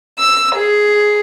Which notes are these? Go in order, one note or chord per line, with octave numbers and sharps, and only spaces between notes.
E6
G#4